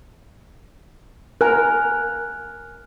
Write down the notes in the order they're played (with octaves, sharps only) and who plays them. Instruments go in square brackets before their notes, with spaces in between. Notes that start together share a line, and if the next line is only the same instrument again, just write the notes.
[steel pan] A#4 [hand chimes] G#5 F6 F#6